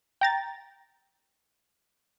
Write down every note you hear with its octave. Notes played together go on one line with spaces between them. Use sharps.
G5 A#5 A6